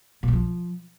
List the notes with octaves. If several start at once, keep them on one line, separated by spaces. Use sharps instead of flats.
A#2
F#3
F3